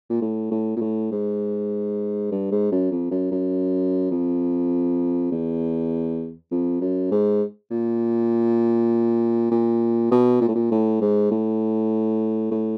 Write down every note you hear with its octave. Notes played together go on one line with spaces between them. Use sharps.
A#2
A2
A2
A#2
A2
G#2
G2
G#2
F#2
F2
F#2
F#2
F2
E2
F2
F#2
G#2
A#2
A#2
B2
A#2
A2
A#2
A2
G#2
A2
A2